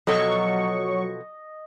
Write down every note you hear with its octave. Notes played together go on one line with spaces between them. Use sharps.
B2 F3 F#3 A4 D#5 C#6